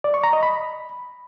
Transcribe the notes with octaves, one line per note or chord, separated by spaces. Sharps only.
D5
C#6
A#5
D#5
B5